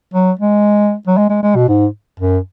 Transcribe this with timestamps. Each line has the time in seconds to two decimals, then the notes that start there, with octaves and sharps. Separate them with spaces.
0.14 F#3
0.39 G#3
1.07 F#3
1.17 G#3
1.30 G#3
1.43 G#3
1.55 B2
1.68 G#2
2.20 F#2